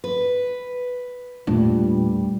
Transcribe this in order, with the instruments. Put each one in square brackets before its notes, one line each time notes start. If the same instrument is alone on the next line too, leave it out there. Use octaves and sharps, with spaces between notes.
[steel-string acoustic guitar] B4
[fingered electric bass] E2 A3 D4 [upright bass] A#2 [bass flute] G3